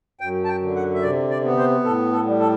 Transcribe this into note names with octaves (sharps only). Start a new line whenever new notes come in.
F#2 G5
A5
G5
D3
F#5
E5
C3 D5
D5
B3
C5
A2 A4
A4
G3
A4